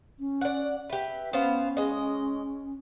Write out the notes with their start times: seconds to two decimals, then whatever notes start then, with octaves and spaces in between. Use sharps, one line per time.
0.19 C#4
0.41 D5 F#5
0.89 G4 B4 E5
1.33 B3 C#4 C5 F5
1.77 G#3 D#5